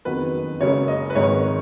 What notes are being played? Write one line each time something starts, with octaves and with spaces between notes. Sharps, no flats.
F#1 F2 D#3 F#3 B3 B4
F#1 F#2 C#3 G#3 C#5
D#5
B4
G#1 G#2 D#3 G#3 C#5